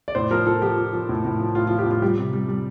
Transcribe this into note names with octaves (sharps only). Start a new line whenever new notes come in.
D5
A2 C5
F3 A#4
F3 A4
F3 G4
F3
F3
A2
A2
F3
A2 F4
F4
F3
G4
A2 F4
G3 G4
C3
G3
G3